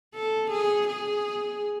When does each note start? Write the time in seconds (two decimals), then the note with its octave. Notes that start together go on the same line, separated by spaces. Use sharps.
0.15 A4
0.51 G#4
0.87 G#4